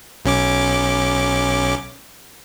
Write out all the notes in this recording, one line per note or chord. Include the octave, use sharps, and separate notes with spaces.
B1 C#4 D6